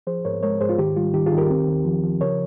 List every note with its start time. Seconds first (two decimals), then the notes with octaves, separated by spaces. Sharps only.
0.07 F3 G#4 C5
0.25 G#2 A#4 C#5
0.43 G#3 A#4 C#5
0.60 G#2 G#4 C5
0.69 F4
0.78 D#3 G4
0.96 G3 F4
1.14 D#3 G4
1.26 F4 G#4
1.32 D#3
1.38 G4 A#4
1.50 C4
1.68 D#2
1.85 F3
2.04 F3
2.21 C#3 A#4 C#5